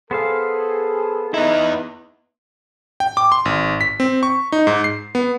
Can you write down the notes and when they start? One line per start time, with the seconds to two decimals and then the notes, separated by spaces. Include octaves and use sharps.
0.11 B3 G#4 A4 C5 F5
1.34 B3 D#4 E4
3.00 G5
3.17 D6
3.32 C6
3.45 G#1
3.81 B6
4.00 C4
4.23 C#6
4.52 D#4
4.67 G#2
4.84 C7
5.15 B3